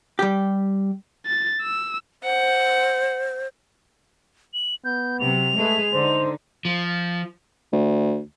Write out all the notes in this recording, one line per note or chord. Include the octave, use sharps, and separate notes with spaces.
G3 G4
A6
E6
C5 F#5
F#7
B3 G6
C3 F#3 F7
G#3 A3 G#4 B4
D3 D#4 C5
F3
D2